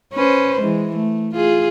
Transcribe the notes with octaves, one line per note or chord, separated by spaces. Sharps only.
C#4 B4 C5
E3 G#3
A3
F4 G#4